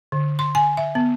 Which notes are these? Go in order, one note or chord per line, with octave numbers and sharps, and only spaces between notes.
D3
C6
G#5
E5
B3